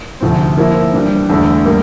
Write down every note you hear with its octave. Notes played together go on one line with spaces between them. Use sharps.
D2 C3 F3 C4
F3 A#3 E4
G2 E3 G3
E2 D3 A3
G3 A#3